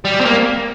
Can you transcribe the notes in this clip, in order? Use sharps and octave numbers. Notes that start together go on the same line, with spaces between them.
G3
C4
A#3